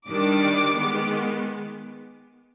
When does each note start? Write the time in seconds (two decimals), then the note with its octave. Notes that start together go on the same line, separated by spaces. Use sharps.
0.08 D#3 G3 D4 D6
0.76 D#3 G#3 B3